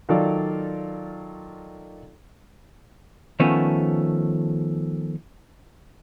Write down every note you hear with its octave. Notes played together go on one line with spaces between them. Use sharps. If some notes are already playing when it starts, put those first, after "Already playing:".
D#3 F#3 F4 A4 D5
D#3 F3 A3 B3 C#4